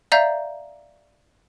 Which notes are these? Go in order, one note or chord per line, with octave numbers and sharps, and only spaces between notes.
D5 E5 F5 A#5 G6